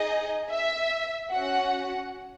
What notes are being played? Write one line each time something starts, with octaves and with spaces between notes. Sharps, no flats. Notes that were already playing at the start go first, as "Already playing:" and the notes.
Already playing: D#4 G#4 D#5
E5
C#4 F#4 F#5